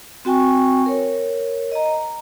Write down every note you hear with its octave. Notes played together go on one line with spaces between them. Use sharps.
C4 F#4 G5 G#5 C#6
A#4 C#5
D#5 A#5
A#5